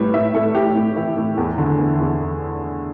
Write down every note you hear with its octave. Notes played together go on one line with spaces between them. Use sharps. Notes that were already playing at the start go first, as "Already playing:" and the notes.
Already playing: A2 G3 B4
A2 E5
A2 A4
A2 G4
A2
E3 E4
A2
E2
D3
E2
E2